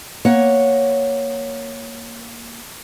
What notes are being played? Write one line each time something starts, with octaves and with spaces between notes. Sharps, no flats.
A#3 C#5 F#5